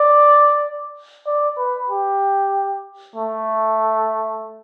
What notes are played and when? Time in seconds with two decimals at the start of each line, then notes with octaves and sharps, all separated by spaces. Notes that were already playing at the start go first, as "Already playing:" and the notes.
Already playing: D5
1.27 D5
1.58 B4
1.90 G4
3.16 A3